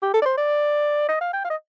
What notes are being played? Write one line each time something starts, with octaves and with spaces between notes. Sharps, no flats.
G4
A4
D5
C5
D5
D#5
F5
G5
F5
D#5